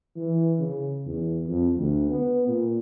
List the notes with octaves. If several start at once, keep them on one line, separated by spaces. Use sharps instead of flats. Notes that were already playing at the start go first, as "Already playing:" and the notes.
E3
C#3
E2
F2
D2
B3
A#2